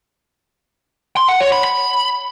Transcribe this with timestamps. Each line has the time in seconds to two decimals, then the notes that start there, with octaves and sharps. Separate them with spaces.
1.17 C6
1.28 F#5
1.40 C#5
1.52 B5
1.64 B5